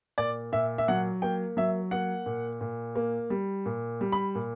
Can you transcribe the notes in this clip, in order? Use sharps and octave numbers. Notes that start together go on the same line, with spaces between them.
A#2 D5
A#2 E5
E5
F#3 F#5
A#3 G5
F#3 E5
A#3 F#5
A#2
A#2
A#3
G3
A#2
G3
B5
A#2